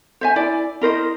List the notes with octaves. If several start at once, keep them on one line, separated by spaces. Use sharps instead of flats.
C5 E5 G#5
E4 D5
E4 A#4 C5 D#5